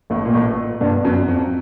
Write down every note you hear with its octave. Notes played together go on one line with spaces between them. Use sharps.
A1 A2
A#2
A1 A2
G1 G2
F#2
F2